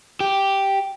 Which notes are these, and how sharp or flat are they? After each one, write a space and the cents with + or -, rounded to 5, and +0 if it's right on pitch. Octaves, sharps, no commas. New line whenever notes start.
G4 +0